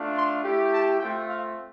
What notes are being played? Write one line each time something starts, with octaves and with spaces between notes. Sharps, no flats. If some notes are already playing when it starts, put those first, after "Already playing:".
Already playing: A3 D4 F4
C6
A3 E4 G4
A5
A3 C4 F4 G5
F5